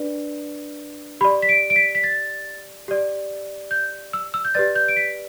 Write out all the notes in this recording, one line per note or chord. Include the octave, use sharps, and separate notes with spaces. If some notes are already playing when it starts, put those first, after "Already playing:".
Already playing: D4 B4 D5
G4 D5 B5
B6
D7
D7
B6
B6
A6
G4 D5
G6
E6
E6
G6
G4 B4 D5 A6
G6
D7
B6